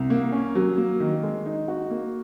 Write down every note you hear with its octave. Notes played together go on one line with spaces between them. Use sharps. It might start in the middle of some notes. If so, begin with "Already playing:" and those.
Already playing: C2
A#3
C#4
F#3
A#3
D#3
G#3
D#4
F#4
A#3